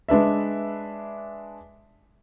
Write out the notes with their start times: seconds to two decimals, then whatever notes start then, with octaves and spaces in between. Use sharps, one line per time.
0.09 G#3 D4 B4 E5